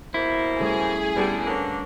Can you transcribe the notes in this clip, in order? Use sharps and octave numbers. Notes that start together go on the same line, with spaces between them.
B2 A#3 E4 C5
G3 A3 C#4 G#4
D3 G3 B3
D3 A#3 D4 A#4 C#5